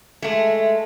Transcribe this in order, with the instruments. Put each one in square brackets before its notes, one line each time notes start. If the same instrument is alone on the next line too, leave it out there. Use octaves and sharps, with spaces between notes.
[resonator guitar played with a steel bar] G#3 A3